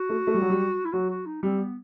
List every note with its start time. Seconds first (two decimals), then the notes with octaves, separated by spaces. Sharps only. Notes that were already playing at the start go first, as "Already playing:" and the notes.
Already playing: F#4
0.10 A3
0.27 A3
0.34 G3
0.42 F#3
0.50 G3
0.85 E4
0.93 F#3 F#4
1.09 F#4
1.26 D#4
1.43 G3 C4
1.59 B3